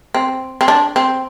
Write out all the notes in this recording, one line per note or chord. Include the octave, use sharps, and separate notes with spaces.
C4
C4
D4
C4